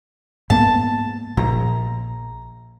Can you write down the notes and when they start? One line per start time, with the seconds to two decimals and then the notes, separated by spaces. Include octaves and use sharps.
0.50 G#2 A#3 B3 A5
1.37 A#1 A#5